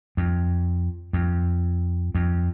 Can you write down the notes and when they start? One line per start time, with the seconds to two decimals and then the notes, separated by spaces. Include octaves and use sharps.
0.17 F2
1.13 F2
2.15 F2